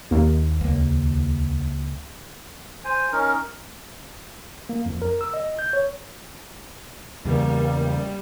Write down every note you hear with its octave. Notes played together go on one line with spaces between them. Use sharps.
D#2
C#2 A#3
C5 G#5
C#4 D#4 A#4
A#3
F2
A#4
E6
D#5
G6
C#5
E2 C#3 E3 G3 A#3